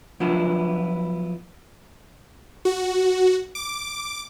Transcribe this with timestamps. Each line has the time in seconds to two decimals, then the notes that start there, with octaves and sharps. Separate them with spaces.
0.20 F3 F#3 B3 D4 E4 F4
2.65 F#4
3.55 D6